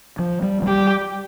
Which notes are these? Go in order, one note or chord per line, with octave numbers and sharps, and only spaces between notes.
F3
G3
F3
G3 G4